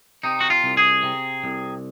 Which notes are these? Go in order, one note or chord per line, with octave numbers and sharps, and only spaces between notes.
C3 D#4
F#4
F4
C2
G#4
C3
C2